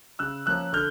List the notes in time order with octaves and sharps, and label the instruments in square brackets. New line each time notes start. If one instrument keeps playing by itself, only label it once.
[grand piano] C#3 E6 F#6
F3 A#3 C#4 E6 F#6
D3 F6 G6